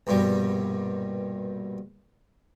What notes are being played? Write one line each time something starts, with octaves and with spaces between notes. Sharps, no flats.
A#1 G2 B2 G3